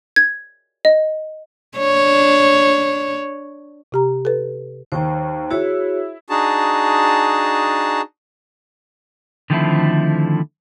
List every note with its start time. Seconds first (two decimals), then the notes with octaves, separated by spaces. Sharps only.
0.16 G#6
0.85 D#5
1.78 D4 C#5
3.92 C3 G4 A#5
4.25 A4 B4
4.92 D#2 D#3 C5 G5 A#5
5.51 E4 F#4 G#4 C#5
6.29 D4 D#4 F#4 G#4 A5
9.50 D3 D#3 F3 A3 C4 E4